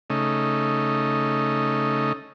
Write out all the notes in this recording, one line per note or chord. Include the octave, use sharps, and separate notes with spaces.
C#3 A3 D#4